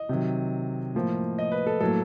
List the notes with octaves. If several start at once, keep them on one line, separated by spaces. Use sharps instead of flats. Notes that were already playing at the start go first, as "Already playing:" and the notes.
Already playing: D#5
C3 D#3 F#3
A2 F3 A#3
D#5
B4
A4
A2 F#3 A#3 A4